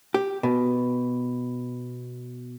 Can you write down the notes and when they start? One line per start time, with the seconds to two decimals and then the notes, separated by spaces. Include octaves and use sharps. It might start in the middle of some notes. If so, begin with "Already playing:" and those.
0.14 G4
0.43 B2